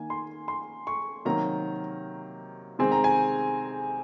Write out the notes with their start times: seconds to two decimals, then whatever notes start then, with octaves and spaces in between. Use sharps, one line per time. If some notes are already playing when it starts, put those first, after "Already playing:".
Already playing: D#3 A#3 G#5
0.10 C6
0.48 C6
0.87 C#6
1.25 C3 D#3 F#3 A#3 A#5
2.79 C3 D#3 G#3 C4 G#5
2.92 A#5
3.04 G#5